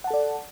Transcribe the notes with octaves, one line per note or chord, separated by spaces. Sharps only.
A4 D5 F#5 A5